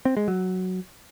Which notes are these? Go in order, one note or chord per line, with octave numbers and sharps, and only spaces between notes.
C4
G#3
F#3